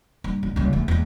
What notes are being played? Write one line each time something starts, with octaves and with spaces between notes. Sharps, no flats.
G2
G1
C#2 G3
E2 A3
E2 G#2